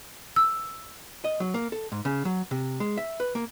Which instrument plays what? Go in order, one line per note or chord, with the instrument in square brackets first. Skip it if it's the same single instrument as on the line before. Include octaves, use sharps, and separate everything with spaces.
[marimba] E6
[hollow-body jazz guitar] D#5
F#3
A#3
A4
G#2
C#3
F#3
C3
G#3
E5
B4
A#3